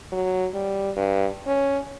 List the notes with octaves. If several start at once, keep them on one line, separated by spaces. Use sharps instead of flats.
F#3
G3
G2
C#4